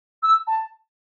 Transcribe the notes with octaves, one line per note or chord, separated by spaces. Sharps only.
E6
A5